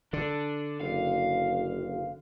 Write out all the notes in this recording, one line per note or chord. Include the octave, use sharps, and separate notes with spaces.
D3 D4
F#1 F5